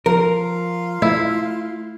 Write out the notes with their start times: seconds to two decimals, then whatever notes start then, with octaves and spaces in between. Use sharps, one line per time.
0.06 F3 F4 A#4
1.02 A3 E4